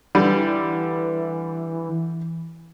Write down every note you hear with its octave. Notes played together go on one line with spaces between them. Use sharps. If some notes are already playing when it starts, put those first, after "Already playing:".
D3 E3 G3